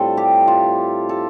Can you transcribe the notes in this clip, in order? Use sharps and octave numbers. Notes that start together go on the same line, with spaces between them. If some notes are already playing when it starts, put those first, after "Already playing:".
Already playing: A2 G3 C4 F4 A4
G4
F4
A4